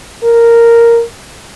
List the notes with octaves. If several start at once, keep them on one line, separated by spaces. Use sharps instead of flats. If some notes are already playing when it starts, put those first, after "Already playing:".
A#4